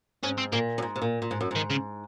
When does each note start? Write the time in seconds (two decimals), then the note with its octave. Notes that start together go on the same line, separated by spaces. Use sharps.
0.23 G#2 C#4
0.38 C4
0.53 A#2 A#3
0.78 F#2
0.82 G#2
0.96 C3
1.02 A#2
1.22 A#2
1.31 G#2
1.41 F#2
1.51 G#2 D#3
1.70 C#3